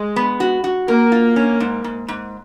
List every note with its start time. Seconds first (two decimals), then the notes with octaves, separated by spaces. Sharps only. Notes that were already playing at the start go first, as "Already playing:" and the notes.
Already playing: G#3
0.16 B3
0.40 F#4
0.64 F#4
0.88 A#3 A#4
1.12 F4
1.36 C#4
1.60 G#2
1.84 G#2
2.08 G#2